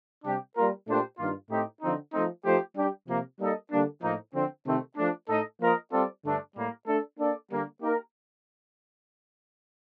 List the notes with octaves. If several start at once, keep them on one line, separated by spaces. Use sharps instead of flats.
C3 G3 D4 G4
G3 A#3 F4 A#4
A#2 A3 D4 G4 C5
G2 D#3 A#3 F4
A2 A3 C4 D#4 G4
D3 F3 C4 D#4
F3 A3 C4 D#4
F3 A3 D#4 G4 C5
G3 D4 G4
C3 F3 A#3
G3 A#3 D#4 A4 D#5
D3 G3 A#3 D4
A2 F3 A#3 D#4
D3 F3 C4
C3 D#3 A3 C4
F3 A3 D4
A2 A3 D#4 A4 D#5
F3 A#3 F4 A#4 D#5
G3 C4 F4 A4 D5
G2 D3 A3 D4
A2 G3 A#3
A3 D4 A4
A#3 D4 A4 D5
D3 G3 A#3
A#3 D#4 G4 A#4